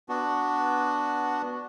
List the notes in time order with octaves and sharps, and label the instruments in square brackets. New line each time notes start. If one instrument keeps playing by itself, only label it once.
[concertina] B3 D4 F#4